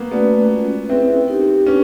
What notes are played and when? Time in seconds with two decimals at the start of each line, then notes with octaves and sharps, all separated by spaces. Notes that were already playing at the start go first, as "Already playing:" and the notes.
Already playing: A#3 B3
0.11 A3 B3 C#4 F#4 B4 D5
0.51 G#3 C#4 F4
0.89 C4 C#4 E4 G#4 B4 E5
1.28 D#4 G4 A#4
1.66 C#4 D4 G4 B4